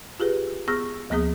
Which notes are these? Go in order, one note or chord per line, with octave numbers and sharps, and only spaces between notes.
F4 G4 G#4 B4
B3 G#4 C#6 E6 F6 A#6
D2 F3 A#3 B3 G#4 D#6